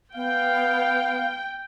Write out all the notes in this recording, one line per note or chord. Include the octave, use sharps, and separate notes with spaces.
B3 F5 G5